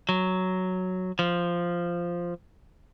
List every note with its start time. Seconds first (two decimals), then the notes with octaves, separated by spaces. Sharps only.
0.09 F#3
1.19 F3